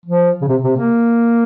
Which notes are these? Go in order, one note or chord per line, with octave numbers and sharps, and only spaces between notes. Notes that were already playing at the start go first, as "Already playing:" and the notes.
F3
C#3
C3
C3
A#3